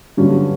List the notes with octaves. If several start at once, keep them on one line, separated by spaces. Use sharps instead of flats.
G2 D3 F#3 C#4